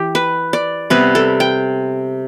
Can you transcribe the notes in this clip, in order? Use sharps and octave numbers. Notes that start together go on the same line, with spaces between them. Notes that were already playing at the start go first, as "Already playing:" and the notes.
Already playing: E3 G4
B4
D5
C3 G3 B3 B4
A4
G5